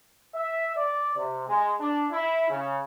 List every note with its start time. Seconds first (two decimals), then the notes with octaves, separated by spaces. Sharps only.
0.34 E5
0.76 D5
1.16 C3
1.48 G#3
1.79 D4
2.11 E4
2.50 C#3